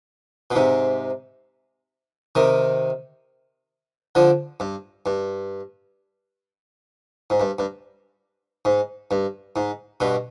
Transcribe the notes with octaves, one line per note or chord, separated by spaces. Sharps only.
B2
G#2 C3
C3 D#3
D3 F3
G2
G2
G#2
G2
G2
G#2
G2
G#2
G2 B2